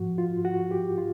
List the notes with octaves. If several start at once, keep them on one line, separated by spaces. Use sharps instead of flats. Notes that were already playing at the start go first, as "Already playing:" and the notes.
Already playing: G#2 F3 F#4
F4
F#4
G4
F4